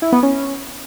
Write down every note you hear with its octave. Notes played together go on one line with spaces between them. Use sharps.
E4
B3
C#4